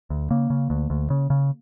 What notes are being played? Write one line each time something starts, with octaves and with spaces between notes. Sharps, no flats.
D2
C#3 A#3
C#3
D2
D2
C#3
C#3